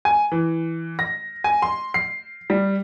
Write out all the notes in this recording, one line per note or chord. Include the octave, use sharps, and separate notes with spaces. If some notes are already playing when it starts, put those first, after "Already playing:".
G#5
E3
A#6
G#5
C6
C7
G3